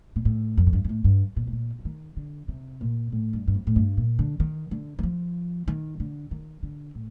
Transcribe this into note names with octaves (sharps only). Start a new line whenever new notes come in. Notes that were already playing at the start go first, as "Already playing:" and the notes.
A#2
A2
F2
A2
G2
G2
A2
G2
A#2
A2
A#2
F3
D#3
D3
C3
A#2
A2
G2
G2
F2
A2
G2
A#2
D3
D#3
D3
D#3
F3
D#3
D3
D#3
D3
A2